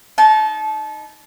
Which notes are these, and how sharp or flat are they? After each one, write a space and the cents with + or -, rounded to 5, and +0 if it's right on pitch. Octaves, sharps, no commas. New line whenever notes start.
D#4 +0 A5 -25